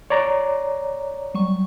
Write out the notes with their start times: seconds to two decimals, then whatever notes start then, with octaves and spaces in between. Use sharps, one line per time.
0.10 C#5 D5 A#5
1.34 F#3 G3 C#6